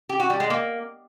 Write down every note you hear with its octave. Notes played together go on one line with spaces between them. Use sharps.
G4
F#4
G3
G#3
A#3